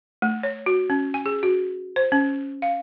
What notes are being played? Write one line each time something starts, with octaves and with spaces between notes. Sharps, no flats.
A3
C#5
F#4
C#4
G#5
G#4
F#4
C5
C#4
F5